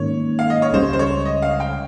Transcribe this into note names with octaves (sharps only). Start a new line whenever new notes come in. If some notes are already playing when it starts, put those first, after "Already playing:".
Already playing: G#2 D#3 A#3 C#4 C#5
F5
D#5
C#5
C#2 C#3 G3 C5
C5
C#5
D#5
F5
G5